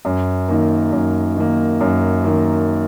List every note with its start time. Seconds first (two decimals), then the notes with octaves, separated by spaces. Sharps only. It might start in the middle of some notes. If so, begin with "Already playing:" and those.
0.05 F#2
0.48 D#3 A#3
0.92 F#2
1.37 D#3 A#3
1.81 F#2
2.24 D#3 A#3